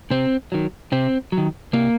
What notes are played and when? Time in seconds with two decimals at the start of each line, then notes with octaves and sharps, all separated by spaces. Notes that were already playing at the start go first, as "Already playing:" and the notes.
0.11 C3 C4
0.52 D#3 F#3
0.92 C3 C4
1.32 F#3
1.38 D#3
1.73 C3 A#3